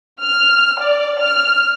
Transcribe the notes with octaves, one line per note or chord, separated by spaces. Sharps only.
F6
D5
F6